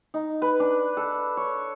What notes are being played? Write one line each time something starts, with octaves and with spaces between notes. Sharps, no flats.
D#4
B4
D4
A4
C#5